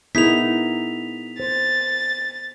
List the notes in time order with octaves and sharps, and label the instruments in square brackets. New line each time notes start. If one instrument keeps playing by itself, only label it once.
[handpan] B3 G#4 A#4 [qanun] D#4 E4 [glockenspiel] B6 F7
[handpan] C5 [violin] A6